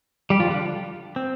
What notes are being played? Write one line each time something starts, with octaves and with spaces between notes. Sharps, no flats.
G3 G4
F3 F4
D3 D4
C4